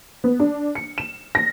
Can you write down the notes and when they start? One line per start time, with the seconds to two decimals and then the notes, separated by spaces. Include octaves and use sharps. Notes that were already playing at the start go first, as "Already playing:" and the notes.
0.24 B3
0.40 D4
0.75 C#7
0.98 E7
1.35 A#6